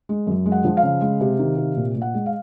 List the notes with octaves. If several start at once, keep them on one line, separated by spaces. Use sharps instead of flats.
G#3
F#2
G#3
F#5
F3
F5
C#3
G#3
C3
D#3
C3
A#2
A#2
F#5
G#3
F5